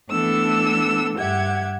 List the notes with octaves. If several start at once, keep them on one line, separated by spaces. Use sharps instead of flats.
E3 A3 B3 D4 A4 E6
G2 G4 E5 F#5 G#6